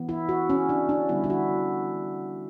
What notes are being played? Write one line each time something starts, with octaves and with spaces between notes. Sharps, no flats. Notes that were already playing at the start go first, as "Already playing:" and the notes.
Already playing: E3 B3
E4
F#4
C#4
D4
D4
D3 G3 B3 E4
E4
F#4